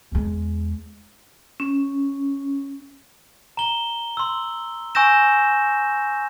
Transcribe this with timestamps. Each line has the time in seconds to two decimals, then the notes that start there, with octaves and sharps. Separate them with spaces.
0.12 E2 G#3
1.60 C#4
3.57 A#5 G7
4.17 C6 E6
4.95 G#5 C#6 E6 G6 A#6 E7